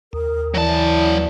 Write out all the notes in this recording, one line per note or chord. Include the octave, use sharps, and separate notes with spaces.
D#2 A#4
E3 F#3 D5 A5